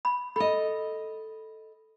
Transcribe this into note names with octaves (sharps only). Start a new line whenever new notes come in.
B5
A4 D#5 B5